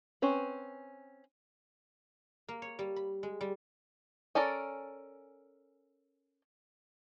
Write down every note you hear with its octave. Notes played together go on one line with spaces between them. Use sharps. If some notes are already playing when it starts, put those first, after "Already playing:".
C4 C#4 B4
A#3
C#5
G3
B5
G#3
G3
C#4 A4 A#4 D5